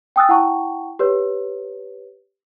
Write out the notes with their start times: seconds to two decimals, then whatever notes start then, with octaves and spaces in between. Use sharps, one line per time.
0.16 G5 G#5 D#6 E6 F#6 A6
0.29 E4 F#5 G5 A5 C#6
0.99 G4 B4 C#5